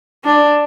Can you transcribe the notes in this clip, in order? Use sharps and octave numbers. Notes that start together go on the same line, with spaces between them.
D4